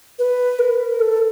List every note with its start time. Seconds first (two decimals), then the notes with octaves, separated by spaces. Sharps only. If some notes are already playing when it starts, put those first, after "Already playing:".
0.19 B4
0.59 A#4
0.90 A#4
1.00 A4